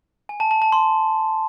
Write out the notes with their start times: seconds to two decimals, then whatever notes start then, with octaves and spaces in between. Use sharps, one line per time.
0.29 G#5
0.40 A5
0.51 A5
0.62 A5
0.72 C6